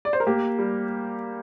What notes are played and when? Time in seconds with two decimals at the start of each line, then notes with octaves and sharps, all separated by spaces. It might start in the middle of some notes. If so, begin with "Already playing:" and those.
0.05 D5
0.13 C5
0.20 A#4
0.26 A#3 G4
0.59 G3